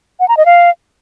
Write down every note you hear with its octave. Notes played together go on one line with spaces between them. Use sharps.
F#5
A#5
D#5
F5